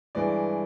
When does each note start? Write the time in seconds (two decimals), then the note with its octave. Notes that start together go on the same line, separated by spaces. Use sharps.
0.15 G2 E3 G#3 D5